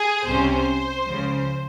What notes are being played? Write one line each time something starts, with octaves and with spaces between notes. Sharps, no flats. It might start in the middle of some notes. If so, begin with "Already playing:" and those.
Already playing: G#4
C2 C3 G3 C#4 C5
C#2 C#3 F3